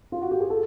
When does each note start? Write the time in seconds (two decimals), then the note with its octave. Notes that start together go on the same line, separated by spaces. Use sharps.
0.12 F4
0.22 F#4
0.31 G4
0.40 G#4
0.50 A4